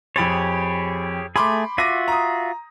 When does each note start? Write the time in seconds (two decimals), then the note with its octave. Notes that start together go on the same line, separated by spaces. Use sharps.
0.16 F2 G4 G#4 C#5 B5 A6
1.36 A3 G#4 B5 C6 D6
1.78 F4 F#4 E5 D6 A#6 D#7
2.08 A#5 D#6